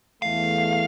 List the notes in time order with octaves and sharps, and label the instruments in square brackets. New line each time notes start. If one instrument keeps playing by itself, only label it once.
[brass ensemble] E2 A3 [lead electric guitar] F5